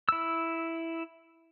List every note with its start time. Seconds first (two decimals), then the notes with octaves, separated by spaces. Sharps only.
0.09 E4 E6